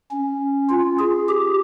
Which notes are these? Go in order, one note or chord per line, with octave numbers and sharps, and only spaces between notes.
C#4
F4
G#4
G4